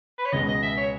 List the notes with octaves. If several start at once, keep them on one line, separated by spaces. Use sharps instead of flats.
B4
C#5
C#2 B2 G#3 B3 D#5
D#5
E5
C#5